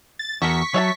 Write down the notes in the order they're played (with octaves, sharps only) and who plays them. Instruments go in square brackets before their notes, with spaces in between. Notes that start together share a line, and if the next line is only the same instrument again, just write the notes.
[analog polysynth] A6
[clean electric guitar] E2 [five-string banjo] F#4 A4 A#4 [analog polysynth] C#6 B6
[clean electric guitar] F#3 [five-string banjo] C#5 E5 A5